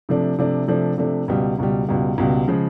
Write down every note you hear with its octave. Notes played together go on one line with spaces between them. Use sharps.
C3 F3 A3 D4
C3 F3 A3 D4
C3 F3 A3 D4
C3 F3 A3 D4
C#2 B2 G3
C#2 B2 G3
C#2 B2 G3
C#2 B2 G3
C#3 F3 G#3